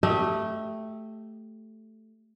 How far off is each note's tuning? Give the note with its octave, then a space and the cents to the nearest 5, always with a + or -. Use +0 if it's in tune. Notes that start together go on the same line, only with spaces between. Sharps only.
A3 +0 G4 +0 D#5 +35